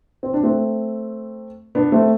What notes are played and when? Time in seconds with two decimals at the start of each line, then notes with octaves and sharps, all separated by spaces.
0.23 C4
0.34 D4
0.43 A3 C4
1.75 B3 D4
1.92 A3 C4